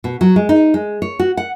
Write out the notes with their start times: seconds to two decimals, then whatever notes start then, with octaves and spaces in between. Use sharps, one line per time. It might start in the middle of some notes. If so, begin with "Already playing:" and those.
0.04 B2
0.21 F#3
0.36 G#3
0.49 D#4
0.74 G#3
1.02 C#5
1.19 F#4
1.37 F#5